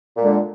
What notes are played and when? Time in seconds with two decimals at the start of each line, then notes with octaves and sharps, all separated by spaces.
0.17 A#2
0.21 G#3
0.25 D3